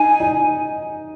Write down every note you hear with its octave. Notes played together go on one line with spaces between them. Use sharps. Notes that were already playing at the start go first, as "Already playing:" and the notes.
Already playing: D#4 G#5
D#4